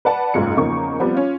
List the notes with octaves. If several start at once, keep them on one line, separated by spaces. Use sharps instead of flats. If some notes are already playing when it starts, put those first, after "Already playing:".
B4 D5 F#5 A5
F#1 B1 G#2 G#3 F4 C#7
E2 C#3 F3 A#3 D#4 C#6
F3 G3 B3 C4
C#4 F4